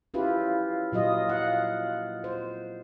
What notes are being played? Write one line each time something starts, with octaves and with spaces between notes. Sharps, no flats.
C#4 E4 F4 G4 B4
A#2 F#3 F4 D#5
F5 F#5
C5